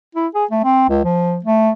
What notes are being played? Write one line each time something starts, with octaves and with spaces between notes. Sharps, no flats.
E4
G#4
A3
C4
C#2
F3
A3